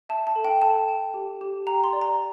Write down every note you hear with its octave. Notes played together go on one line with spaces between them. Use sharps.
E5 A5
A5
A4
G5
A4 A5
G5
G4
G4
G5 A#5
C6
D5
A#5